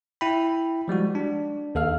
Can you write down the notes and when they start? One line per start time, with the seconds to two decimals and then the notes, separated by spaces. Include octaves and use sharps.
0.21 E4 G5 B5
0.88 F3 G3 G#3 F#4
1.15 D4
1.75 D#2 A4 F5 F6